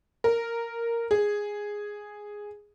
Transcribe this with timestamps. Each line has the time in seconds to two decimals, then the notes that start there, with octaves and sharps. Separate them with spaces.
0.24 A#4
1.11 G#4